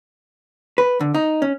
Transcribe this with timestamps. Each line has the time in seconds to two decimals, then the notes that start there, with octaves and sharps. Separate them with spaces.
0.78 B4
1.01 D3
1.15 D#4
1.42 C#4